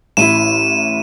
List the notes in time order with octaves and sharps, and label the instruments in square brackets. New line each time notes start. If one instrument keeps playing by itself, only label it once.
[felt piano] A1 E4 [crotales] D#7 E7